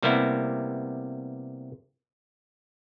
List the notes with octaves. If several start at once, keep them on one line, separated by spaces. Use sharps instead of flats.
C3 G3 A#3 B3 E4